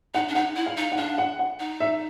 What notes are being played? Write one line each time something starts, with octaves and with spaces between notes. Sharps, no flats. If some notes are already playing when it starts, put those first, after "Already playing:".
D#4 F#5
D4
D#4 F#5
E4
F5
D#4
F#5
D4 F5
F#5
F#5
D#4
E5